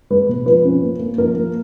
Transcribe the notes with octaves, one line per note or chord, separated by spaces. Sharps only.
G#3 B4
B2
F3 B4
C#4
A#3
A#3
F3 A#4
A#3